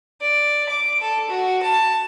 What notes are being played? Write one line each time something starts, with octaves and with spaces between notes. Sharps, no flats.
D5
D6
A4
F#4
A5